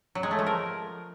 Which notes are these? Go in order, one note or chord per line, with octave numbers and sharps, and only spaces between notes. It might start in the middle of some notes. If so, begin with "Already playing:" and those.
F#3
G#3
A3
F3
A#4